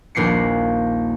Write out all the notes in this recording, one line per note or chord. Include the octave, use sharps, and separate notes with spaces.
D#1 A#1 A#3 C7 C#7